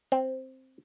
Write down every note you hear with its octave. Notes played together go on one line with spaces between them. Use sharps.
C4